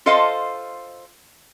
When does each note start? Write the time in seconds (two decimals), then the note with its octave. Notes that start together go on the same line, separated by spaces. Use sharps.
0.06 F4 A4 C5 D#5 F5